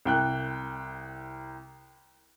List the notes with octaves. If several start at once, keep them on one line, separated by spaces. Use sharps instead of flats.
C2 G5 F#6